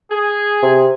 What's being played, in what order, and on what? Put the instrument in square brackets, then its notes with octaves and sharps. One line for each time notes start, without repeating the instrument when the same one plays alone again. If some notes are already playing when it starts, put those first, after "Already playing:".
[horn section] G#4
[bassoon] C3